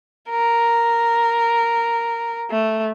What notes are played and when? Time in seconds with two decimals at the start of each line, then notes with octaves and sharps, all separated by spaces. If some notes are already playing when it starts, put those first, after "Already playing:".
0.30 A#4
2.51 A3